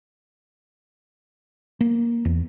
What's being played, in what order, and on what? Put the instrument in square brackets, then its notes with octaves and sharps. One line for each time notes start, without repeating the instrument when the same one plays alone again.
[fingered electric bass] A#3
E2